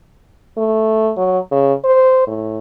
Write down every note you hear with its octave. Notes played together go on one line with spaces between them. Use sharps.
A3
F#3
C#3
C5
A2